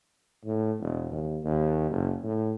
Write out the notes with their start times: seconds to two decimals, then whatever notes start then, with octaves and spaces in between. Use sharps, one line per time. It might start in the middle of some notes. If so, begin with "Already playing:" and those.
0.45 A2
0.80 E1
1.11 D#2
1.44 D#2
1.91 F#1
2.24 A2